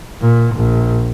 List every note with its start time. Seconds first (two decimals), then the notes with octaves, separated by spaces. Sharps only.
0.21 A#2
0.56 A#1